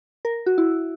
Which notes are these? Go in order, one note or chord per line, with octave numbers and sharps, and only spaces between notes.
A#4
F#4
E4